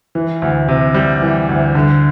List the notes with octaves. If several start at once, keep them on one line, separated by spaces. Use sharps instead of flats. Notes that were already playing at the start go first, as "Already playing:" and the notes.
E3
D2
C3
G3
E3
D2
D3